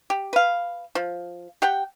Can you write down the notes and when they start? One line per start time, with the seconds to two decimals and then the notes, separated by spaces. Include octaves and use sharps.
0.10 G4
0.33 B4 F5
0.95 F3
1.62 G4 F#5 G5